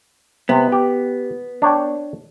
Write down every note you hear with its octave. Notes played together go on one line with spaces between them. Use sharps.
C3 B3
G4
D4 C#5 G5